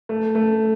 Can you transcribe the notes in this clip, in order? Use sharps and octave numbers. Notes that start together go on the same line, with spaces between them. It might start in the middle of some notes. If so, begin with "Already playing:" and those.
A3
A3